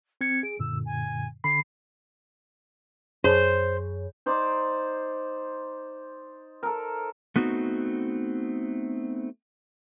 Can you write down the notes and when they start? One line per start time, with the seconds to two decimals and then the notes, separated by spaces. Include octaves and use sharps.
0.21 C4 G#6 C#7
0.43 G#4 D7
0.59 F#2 A#2 D3 E6
0.85 G#5
1.44 D3 B5 C7
3.24 F#2 G#4 C5 C#5
4.26 D#4 C5 D5
6.63 A4 A#4
7.36 A3 B3 C4 D#4 F#4